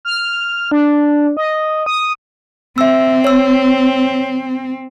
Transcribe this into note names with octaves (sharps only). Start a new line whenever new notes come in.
F6
D4
D#5
D#6
C4 E5 E6
C#5 E6